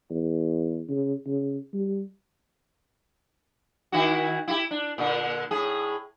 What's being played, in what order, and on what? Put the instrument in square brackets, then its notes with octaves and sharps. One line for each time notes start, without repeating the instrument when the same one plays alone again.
[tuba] E2
C#3
C#3
G3
[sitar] D#3 E4 F#4
E4 F#4 G4
D4
A#2 D3
A2 G#4